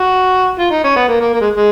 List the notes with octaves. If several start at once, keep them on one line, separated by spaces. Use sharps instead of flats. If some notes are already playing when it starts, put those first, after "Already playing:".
Already playing: F#4
F4
D#4
C#4
B3
A#3
A#3
A#3
G#3
G#3